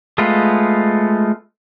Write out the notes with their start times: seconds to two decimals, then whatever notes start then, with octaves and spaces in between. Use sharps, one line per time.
0.18 G#3 A3 B3 F4